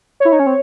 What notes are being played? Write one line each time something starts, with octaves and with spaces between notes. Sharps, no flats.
E4 C#5
D#4
C#4
C4